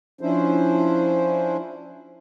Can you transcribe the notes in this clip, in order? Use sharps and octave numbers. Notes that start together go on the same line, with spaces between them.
F3 C#4 D4 E4 C5